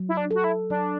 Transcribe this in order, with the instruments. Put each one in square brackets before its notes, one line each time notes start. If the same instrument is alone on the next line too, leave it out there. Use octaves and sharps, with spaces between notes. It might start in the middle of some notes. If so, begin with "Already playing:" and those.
Already playing: [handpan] F#3
[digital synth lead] E4
D4
[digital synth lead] F#4 [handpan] A4
[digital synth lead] E4
[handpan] F#3 [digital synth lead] D4